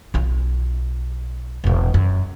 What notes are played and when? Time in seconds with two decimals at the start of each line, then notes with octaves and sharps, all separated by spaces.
0.14 B1 F4
1.64 E1 A#1
1.94 F#2